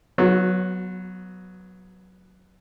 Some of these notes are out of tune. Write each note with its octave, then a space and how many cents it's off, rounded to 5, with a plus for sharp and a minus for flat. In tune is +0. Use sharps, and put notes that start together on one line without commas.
F#3 +0 B3 +0 F#4 -40